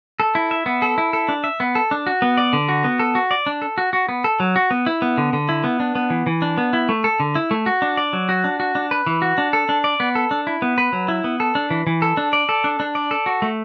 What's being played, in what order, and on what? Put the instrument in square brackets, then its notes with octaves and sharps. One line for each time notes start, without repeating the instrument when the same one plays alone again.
[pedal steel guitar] A4
E4
E5
B3
A4
E4
A4
D4
E5
B3
A4
D4
F#4
B3
D5
D3
F#4
B3
A4
F#4
D5
D4
A4
F#4
F#4
B3
A4
F#3
F#4
B3
E4
B3
D3
D3
E4
B3
D4
B3
E3
E3
D4
B3
E4
A3
A4
D3
E4
A3
F#4
D4
D5
F#3
F#4
D4
F#4
D4
B4
E3
F#4
D4
A4
D4
D5
B3
A4
D4
E4
B3
B4
F#3
E4
B3
A4
D4
E3
E3
A4
D4
D5
A4
D4
D4
D5
A4
F#4
A3